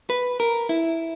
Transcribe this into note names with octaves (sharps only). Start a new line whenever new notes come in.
B4
A#4
E4